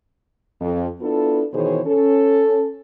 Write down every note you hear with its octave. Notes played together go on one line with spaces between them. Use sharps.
F2
B3 D4 E4 F4 A4
B2 D#3 E3 G#4 C5 C#5
C#4 A4